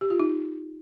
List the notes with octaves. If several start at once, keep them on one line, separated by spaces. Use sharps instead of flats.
G4
F4
D#4